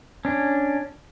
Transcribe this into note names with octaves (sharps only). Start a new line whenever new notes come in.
C#4 D4